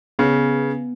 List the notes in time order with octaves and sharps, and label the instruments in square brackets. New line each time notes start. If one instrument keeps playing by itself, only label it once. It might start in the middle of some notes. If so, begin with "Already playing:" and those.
[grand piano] C#3 [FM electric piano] B3